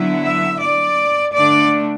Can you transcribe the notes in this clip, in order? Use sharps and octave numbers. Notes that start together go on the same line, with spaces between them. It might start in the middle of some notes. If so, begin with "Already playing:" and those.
Already playing: D3 F#3 B3 E4
E5
D5
D3 A3 D4 D5